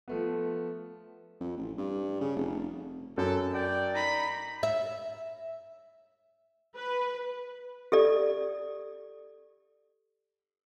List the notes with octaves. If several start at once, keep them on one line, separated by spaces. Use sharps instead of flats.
F3 A3 B3
F2
A1
G2
C#3
F1
F#2 A4
D5 G5
D#4 A#5 B5
E5
B4
G4 A4 D5